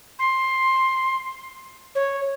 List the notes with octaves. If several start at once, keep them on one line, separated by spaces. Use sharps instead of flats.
C6
C#5